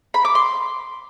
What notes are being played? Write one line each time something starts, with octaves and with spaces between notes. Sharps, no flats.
B5
D6
C6